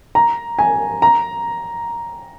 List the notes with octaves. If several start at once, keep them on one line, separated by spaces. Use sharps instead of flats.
A#5
G#5
A#5